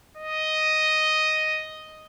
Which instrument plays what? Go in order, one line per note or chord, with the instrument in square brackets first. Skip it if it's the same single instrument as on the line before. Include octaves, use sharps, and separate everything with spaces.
[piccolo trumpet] D#5